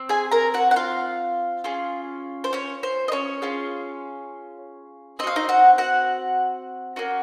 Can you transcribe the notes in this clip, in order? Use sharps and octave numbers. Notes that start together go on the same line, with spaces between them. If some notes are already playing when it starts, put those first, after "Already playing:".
Already playing: C4
G#4 G#5
A#4 A#5
F#4 F#5
F#5
F4 F5
C#4 F4 G#4
C5
C#4 C#5
C5
D#5
C#4 C#5
C#4 F4 G#4
C4 F#4 D#5 F5
D#4 D#5
F#4 F#5
F#4 F#5
A#3 C#4 F#4